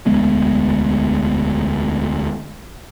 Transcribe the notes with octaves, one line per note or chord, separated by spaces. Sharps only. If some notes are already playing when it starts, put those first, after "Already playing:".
E1 D2 G#3 B3